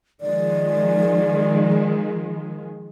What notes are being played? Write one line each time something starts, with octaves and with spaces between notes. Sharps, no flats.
D#3 F3 G#3 D5